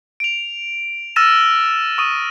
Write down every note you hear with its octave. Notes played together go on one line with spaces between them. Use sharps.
D7 F7
E6 F6 A6 A#6 D#7 E7
C#6 D#6 D#7